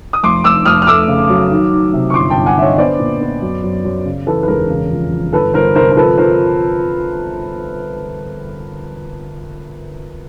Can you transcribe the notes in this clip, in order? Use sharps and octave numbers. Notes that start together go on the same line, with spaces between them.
D#6
F1 C6 D6
F1 D6 E6
F1 D#6 F6
F6
A3 D6 E6
C#3
F#3
D#3
D#3
C3
C#6
G1 C6 D6
G5 A5
G1
F#5 G#5
D3 E5
C#5 D#5
B3 C5 D5
A#2
B3
F#2
F#2
F#2
C#3
E3 A4 B4
B4
E1 G#4 A#4
C#3
F2
F2
G1 A4 B4
G1 A#4 C5
C3 A#4 C5
A#4
F3 A4 B4
F3 A#4 C5